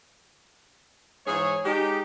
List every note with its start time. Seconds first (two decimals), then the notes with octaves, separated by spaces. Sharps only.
1.26 G#2 E3 G#4 C#5
1.65 G#3 D#4 G4